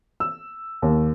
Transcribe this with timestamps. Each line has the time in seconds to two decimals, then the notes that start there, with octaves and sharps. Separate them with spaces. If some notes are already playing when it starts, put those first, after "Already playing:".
0.20 E6
0.82 D#2